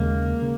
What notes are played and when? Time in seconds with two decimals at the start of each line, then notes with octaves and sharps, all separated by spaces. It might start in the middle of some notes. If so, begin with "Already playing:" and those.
Already playing: D#2 C#3 G#3 A#3
0.42 C#3